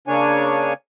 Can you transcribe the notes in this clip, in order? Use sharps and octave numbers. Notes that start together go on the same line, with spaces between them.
C#3 A#3 D4 C#5 G#5